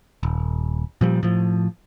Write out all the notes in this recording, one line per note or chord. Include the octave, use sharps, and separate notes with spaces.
D#1
A#2 F3 G3
A2 F3